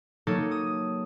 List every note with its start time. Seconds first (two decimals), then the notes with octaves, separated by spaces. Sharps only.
0.27 F#3 A#3 D#4 A4 C#5
0.51 D#6